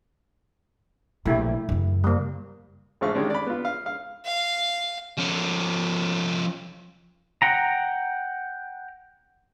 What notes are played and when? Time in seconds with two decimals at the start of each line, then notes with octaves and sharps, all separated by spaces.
1.26 A#1 B2 A3 E4 G4
1.69 F#2 C#3
2.04 G3 A#3
3.01 A1 F3 G#3 A3 F5 C#6
3.15 D#3 G3 G#3 C#4 D4
3.30 D5 B5
3.46 B3 F4
3.65 F5
3.86 F5
4.25 F5
5.18 F3 C#4
7.42 F#5 G5 A#5